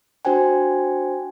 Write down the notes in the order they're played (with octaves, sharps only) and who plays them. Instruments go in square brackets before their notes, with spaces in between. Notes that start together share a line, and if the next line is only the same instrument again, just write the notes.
[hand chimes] D4 F#4 C5 G5 G#5